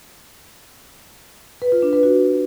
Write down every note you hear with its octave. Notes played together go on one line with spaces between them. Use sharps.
B4
F4
D4
B4
F#4